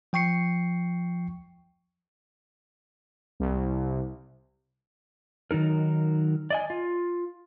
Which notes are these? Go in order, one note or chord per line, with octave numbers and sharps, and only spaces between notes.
F3 G5 C#6 C7 C#7
C2
D#3 F#3 D#4 A#4
D5 D#5 G#5
F4